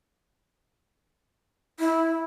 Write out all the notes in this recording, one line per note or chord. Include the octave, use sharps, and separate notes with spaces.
E4